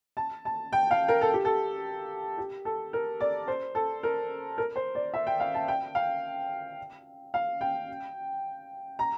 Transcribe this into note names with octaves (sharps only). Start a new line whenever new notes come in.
A5
A5
G5
F5
A#4
A4
G4
A4
G4
A4
A#4
D5
C5
A4
A#4
A#4
C5
D5
E5
G5
F5
A5
G5
F5
F5
G5
A#5